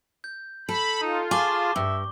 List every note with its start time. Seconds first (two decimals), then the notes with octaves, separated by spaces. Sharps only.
0.24 G6
0.69 A4 B5
1.01 D#4 F4
1.31 G#4 A5 C#6 D6 G7
1.76 G2 E5